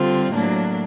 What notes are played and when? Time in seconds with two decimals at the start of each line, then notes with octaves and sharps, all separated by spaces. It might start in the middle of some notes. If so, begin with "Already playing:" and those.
Already playing: D3 G3 C4 F4
0.34 A2 F#3 A#3 D4